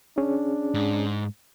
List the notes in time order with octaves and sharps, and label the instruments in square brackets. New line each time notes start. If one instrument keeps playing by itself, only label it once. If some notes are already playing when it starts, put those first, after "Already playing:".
[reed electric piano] C#4 G#4 [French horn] D4
[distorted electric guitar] G#2